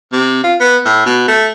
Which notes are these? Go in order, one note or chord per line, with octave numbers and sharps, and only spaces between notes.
C3
F4
B3
A2
B2
A3